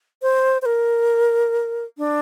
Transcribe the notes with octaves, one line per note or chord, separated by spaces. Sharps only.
C5
C5
A#4
D4